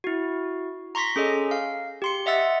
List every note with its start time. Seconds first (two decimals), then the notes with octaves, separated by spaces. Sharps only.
0.04 E4 F#4
0.95 A#5 C6 C#6 A#6 B6
1.16 C#4 G#4 A4 D#5
1.51 F5
2.02 G4 C6 C#7
2.26 D#5 E5 F#5 E6 A6